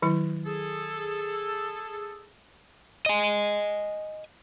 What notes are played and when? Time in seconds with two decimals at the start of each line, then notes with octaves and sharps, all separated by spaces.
0.02 D#3 F#3 E4
0.46 G#4 A4
3.06 D#5 G#5